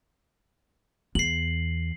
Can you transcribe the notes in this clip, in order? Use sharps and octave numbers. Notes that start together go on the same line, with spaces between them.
E2 C7 F#7